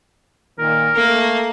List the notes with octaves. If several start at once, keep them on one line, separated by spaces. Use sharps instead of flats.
A#2 D#3 A#4
A3 A#3